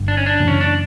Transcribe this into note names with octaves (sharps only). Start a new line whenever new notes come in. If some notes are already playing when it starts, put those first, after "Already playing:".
Already playing: G1 G2 D3
D4
C#4
D4
F#2 C#3 E3 A#3
C#4
D4